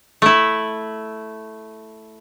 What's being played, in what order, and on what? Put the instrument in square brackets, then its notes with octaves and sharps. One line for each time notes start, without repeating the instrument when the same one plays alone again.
[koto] A3 E4